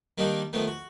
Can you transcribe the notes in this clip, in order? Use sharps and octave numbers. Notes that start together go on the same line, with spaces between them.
D#3 G3 A#3 D4 D#4
D#3 F3 A3 B3
F#4